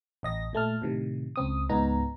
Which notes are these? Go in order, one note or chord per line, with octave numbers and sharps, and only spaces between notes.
A1 D#5 A#6
A#2 A3 A5 F6
A2 C3 D#3
C#2 C4 D#6
C#2 G#2 B3 D#4 A#5